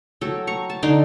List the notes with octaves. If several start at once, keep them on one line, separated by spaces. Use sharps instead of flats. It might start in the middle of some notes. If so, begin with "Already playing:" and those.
F#3 A4 G5
A#5 C#6
A5
D3 D#4 G5 C6